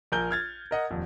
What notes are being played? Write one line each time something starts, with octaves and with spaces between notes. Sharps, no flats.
A#1 A#4 G#5 G6 G7
F6 G#6 A6
A#4 D#5 F#5
D#1 F2